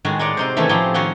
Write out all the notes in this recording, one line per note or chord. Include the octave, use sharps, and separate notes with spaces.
A2 D#3 G#3 F#4
G#3 D#4 G#4 C#5 D5
C3 D#4 C5
D#3 E3 A3 C#4 E4 A4
A2 F3 C4 D#4 G4 G#4
D#3 F3 F#4 C#5 C6